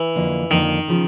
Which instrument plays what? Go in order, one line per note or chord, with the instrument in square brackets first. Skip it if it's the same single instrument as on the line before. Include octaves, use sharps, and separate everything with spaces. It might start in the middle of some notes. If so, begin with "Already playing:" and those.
Already playing: [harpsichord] E3
[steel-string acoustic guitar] F2 D3 F3 A#3
[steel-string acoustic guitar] F2 D3 F3 A#3 [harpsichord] D#3
[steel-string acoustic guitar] C#3 F3